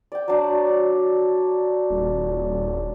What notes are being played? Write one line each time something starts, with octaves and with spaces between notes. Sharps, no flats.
D5 G5
F#3 D4
D#1